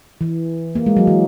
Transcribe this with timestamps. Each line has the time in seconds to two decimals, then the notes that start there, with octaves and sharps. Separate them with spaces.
0.21 E3
0.75 A#3
0.86 G#3
0.97 F#3
1.07 E3